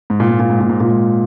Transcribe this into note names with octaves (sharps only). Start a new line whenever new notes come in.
G#2
A#2
G#2
A#2
G#2
A#2
G#2
A#2
G#2